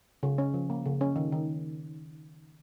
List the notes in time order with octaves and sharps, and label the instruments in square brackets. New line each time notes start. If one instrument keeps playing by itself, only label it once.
[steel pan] C#3
C#4
F3
A#3
C#3
C#4
D#3
D#3